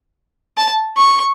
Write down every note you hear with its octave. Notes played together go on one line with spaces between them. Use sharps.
A5
C#6